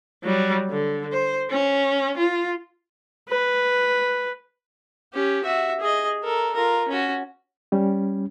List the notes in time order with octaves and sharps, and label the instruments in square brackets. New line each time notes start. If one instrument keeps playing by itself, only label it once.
[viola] F#3 G3
D3
C5
C#4
F4
[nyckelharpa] B4
C#4 G4
F#4 E5
G#4 D#5
A4 A#4
F4 A#4
C#4 F#4
[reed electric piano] G3 C#4